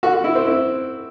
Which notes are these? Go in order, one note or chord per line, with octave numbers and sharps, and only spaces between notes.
F#4
F#4
E4
C4
E4